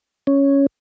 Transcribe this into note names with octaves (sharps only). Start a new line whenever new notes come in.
C#4